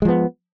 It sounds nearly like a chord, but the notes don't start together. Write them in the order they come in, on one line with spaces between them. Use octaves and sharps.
G#3 F3 B3